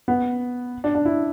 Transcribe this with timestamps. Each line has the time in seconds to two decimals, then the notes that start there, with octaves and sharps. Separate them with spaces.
0.08 B3
0.84 D4
0.95 D4
1.05 E4